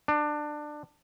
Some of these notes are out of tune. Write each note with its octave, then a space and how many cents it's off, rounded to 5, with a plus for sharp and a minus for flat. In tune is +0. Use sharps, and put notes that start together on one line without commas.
D4 +20